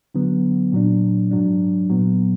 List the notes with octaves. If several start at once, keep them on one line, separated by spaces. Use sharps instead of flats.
D3 F#3 B3
A#2 F#3 D4
G#2 F#3 D4
A#2 F#3 B3